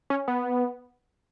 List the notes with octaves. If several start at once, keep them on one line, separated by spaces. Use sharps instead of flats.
C#4
B3